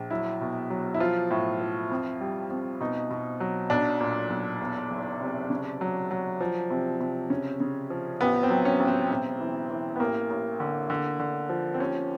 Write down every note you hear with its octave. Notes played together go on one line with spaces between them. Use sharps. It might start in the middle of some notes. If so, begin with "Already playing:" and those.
Already playing: A#1
F#3 E4
B2
F#3
E4
F3 F4
A2
F3
F2
G3
F2
B2 D#4
B2
F#3
B1 D4
A#2
B1
E2
F#1
C3
C#3
F#3
F#3
F3
C3
C3
C#3 C#4
C#3
F3
A1 B3
C4
F#3
C#4
A1
C4
E1
E3
E3
B3
A1 A#3
A1
D3
D3
D3
F3
C4
D#2 C#4